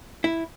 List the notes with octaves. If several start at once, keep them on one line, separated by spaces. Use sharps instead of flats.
E4